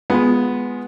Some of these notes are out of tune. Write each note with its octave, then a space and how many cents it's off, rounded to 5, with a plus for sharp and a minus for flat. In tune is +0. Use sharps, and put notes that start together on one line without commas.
G#3 +0 B3 +0 F4 +15